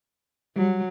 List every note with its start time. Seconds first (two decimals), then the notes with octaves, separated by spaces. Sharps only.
0.56 F#3 G3